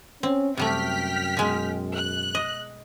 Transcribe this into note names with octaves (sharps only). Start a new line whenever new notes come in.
C4 C#4
F#2 C3 G3 A3 G5 F6 B6
B2 G#3
F#6
D#5